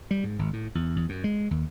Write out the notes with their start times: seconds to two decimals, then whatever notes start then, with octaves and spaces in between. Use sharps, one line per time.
0.11 G3
0.24 G#2
0.39 G#1
0.53 A2
0.75 E2
0.96 E2
1.09 F#2
1.24 G#3
1.51 D#2